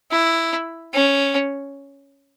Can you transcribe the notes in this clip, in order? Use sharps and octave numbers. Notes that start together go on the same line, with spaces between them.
E4
C#4